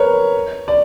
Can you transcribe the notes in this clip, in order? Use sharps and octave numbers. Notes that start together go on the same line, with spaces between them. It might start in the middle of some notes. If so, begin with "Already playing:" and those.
Already playing: A#4 B4 C#5
D5